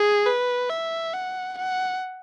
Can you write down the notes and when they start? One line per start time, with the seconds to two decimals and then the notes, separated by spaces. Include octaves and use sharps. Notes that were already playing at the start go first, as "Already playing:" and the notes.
Already playing: G#4
0.26 B4
0.69 E5
1.13 F#5
1.57 F#5